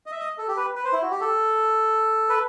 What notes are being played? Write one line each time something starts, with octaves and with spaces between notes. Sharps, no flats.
D#5
E5
D#5
A4
G4
B4
B4
C5
E4
F#4
G4
A4
B4